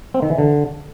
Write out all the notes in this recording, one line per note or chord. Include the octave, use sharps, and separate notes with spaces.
C4
D#3
E3
D3